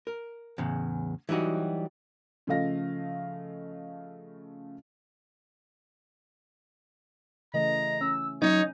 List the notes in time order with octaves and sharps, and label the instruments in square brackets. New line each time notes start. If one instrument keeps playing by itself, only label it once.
[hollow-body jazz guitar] A#4
E2 A2 C#3
E3 F#3 G3 D#4 F#4
[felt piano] C#3 F3 A3 D#5 F5 A#6
[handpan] C#3 E3 A3 [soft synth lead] D#5 [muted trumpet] A#5
[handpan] C#4 [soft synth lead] E6
[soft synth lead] F#3 [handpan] C#4 [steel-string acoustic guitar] D#4 [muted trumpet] C#5